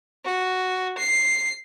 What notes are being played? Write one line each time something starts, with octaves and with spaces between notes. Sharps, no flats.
F#4
C7